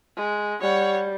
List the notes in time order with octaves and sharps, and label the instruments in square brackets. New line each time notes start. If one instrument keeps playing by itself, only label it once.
[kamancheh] G#3
[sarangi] G3 [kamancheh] C#5 F#5